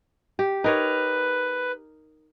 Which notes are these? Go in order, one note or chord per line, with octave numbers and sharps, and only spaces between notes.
G4
D#4 A#4 B4 C#5